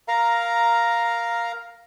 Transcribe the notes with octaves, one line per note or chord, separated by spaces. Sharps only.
A#4 F5 A#5